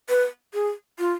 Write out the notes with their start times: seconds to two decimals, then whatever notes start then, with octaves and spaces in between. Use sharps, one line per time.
0.09 B4
0.54 G#4
0.99 F4